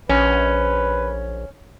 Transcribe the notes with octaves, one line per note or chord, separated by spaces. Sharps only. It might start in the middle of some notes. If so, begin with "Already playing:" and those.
A#1 C#4 B4